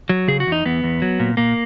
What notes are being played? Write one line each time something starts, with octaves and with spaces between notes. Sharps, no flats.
F#3
C#3 G#4
F#4
E2
D#4
E2 B3
E2
F#3
A#2
A#2 A#3